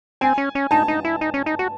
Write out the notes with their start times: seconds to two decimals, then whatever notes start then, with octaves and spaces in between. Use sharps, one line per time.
0.21 C4 G#5
0.38 C#4
0.55 C#4
0.71 D#4 A5
0.88 D#4
1.05 E4
1.21 D#4
1.34 C#4
1.46 D#4
1.59 F#4